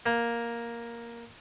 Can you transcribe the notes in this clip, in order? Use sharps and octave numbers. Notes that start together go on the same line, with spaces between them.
A#3